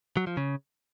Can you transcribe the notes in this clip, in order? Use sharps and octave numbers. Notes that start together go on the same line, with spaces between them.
F#3
F3
C#3